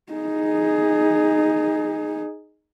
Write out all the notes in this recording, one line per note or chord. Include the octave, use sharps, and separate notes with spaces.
D#4 G#4